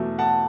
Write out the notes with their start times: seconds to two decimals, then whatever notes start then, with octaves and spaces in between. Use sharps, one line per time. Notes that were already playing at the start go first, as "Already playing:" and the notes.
Already playing: E2 B2 F#3 A3
0.18 F#5 A5